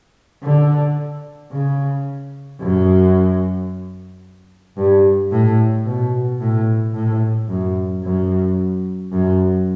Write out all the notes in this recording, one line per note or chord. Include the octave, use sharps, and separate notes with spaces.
D3
C#3
F#2
G2
A2
B2
A2
A2
F#2
F#2
F#2